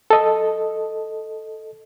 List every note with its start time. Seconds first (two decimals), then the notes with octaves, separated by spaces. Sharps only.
0.10 A4 D#5